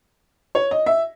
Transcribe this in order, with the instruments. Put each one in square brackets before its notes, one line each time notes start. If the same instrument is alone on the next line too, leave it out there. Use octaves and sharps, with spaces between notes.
[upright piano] C#5
D#5
E5